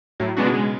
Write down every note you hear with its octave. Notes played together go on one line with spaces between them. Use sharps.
A2 F#3
C#3 G#3 B3 D4 F#4
B2
G#3